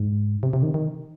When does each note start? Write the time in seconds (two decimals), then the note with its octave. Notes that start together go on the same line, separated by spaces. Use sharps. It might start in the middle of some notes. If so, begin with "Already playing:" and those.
Already playing: G#2
0.43 C3
0.53 C3
0.63 D#3
0.74 D#3